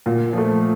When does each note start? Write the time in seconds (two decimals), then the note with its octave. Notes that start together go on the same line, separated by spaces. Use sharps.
0.06 A#2
0.33 F3 A3